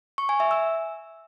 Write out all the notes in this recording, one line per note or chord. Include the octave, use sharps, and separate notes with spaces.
C#6
G#5
E5
E6